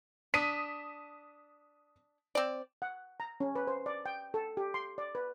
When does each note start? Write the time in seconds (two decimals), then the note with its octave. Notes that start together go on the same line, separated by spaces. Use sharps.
0.34 D4 D#6 B6 D#7
2.35 C4 D5
2.82 F#5
3.20 A#5
3.40 C#4
3.55 B4
3.67 C5
3.86 D5
4.06 G5
4.34 A4
4.57 G4
4.74 C6
4.98 D5
5.15 B4